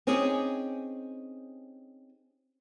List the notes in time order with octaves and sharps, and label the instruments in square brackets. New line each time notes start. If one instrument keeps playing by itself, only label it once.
[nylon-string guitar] C4 C#4 D#4 G4 G#4